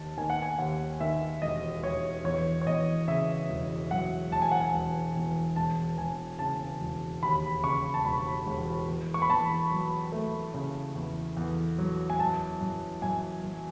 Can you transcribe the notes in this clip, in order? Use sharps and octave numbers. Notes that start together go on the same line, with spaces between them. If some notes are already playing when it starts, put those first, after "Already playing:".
Already playing: D#2 D#3 A5
D#3 G#5
F#5
G#5
D#2 F#5
D#3 E5
E1 D#5
E1 C#5
E2 C#5
C#5
E2 D#5
C#3 E5
E1
F#3 F#5
E1 A5
G#5
F#5
G#5
E1
E2
E1 A5
E1 G#5
C#3 A5
E1
D#2 B5
C#3 C#6
A5
E1 B5
E1
E2
C#6
B5
E2 A5
F#3
A3
C#3
E2
E2
F#3
G#5
F#2 A5
F#2
F#2 G#5
F#3